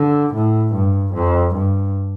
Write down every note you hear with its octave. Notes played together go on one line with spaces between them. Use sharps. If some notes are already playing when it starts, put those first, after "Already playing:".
Already playing: D3
A2
G2
F2
G2